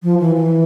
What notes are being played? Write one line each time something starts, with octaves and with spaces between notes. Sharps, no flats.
F3
E3
E3